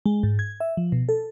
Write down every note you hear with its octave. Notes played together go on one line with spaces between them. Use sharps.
G#3
G#2
G#6
E5
F3
B2
A4